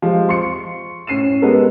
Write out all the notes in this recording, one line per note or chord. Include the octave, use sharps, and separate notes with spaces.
F3 G#3 G4
C6 C#6 C#7
A2 C#4 C7 D#7 E7
G#3 B3 G4 A4 A#4